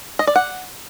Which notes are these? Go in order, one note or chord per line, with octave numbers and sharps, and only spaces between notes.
D#5
D5
F#5